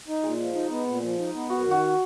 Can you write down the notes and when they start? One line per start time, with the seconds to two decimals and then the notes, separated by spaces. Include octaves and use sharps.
0.08 D#4
0.23 A#2 G#3
0.39 F3
0.55 D#4
0.70 B3
0.87 A#2
1.02 F3
1.19 D#4
1.35 B3
1.50 F#2 F#4
1.66 D#3 F#4